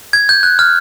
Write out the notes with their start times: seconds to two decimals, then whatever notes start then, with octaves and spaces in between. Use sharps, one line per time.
0.13 G#6
0.29 G6
0.43 F#6
0.59 F6